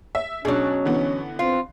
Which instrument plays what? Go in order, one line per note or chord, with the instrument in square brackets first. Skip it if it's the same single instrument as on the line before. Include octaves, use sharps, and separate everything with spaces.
[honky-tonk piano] E5
[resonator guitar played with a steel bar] B2 F#3 [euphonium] C#4 [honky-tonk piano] D4 G#4
[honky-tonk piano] D3 E3 B3
[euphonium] C4 [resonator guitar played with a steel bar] F4